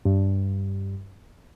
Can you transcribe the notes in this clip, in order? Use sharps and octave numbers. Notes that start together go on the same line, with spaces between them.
G2